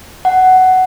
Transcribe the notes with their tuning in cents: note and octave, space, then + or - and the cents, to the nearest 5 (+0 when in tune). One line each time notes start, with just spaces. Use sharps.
F#5 +10